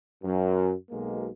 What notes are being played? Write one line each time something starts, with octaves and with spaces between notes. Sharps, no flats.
F#2
B1 B2 G#3 A#3